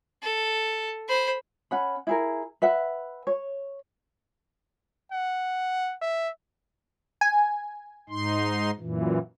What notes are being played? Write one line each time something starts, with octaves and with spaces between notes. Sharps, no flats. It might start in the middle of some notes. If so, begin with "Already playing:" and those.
A4
C5 B5
C#4 F#5 B5
E4 G#4 A#4
B4 E5 F#5
C#5
F#5
E5
G#5
G#2 D#4 C6
F#2 A#2 E3